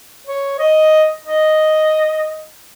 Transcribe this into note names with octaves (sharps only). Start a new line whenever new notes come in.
C#5
D#5
D#5